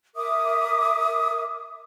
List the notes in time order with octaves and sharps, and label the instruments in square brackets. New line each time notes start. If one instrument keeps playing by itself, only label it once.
[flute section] A#4 E5 D6 D#6